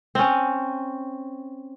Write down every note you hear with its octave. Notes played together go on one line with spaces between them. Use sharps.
C4 C#4